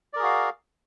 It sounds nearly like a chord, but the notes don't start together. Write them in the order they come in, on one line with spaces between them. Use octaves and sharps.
D5 A#4 G#4 F#4 F5